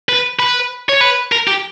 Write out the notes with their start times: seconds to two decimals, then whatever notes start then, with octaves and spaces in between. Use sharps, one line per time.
0.09 B4
0.39 B4
0.89 C#5
1.01 B4
1.32 A#4
1.47 G4